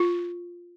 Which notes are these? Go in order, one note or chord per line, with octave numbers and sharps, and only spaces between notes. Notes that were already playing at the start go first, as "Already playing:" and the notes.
Already playing: F4